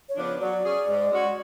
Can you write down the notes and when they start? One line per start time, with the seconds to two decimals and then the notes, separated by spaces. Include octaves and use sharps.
0.09 C#5
0.17 C#3 F3 B3 D4
0.25 C#5
0.41 F#3 D5
0.64 C#4 G#4
0.89 G#2
1.12 G#3 C#4 F#4 C#5